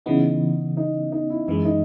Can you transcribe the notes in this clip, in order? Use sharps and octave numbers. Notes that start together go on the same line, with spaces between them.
C#3 E3 B3 D#4
D#4
D#4
E4
F#2 E3 G#3 E4
D#4